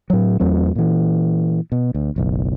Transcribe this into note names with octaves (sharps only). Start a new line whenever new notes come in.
A2 F#3
E2 F#3 A3 C4
A#2 E3
B2
D2
F#1 B1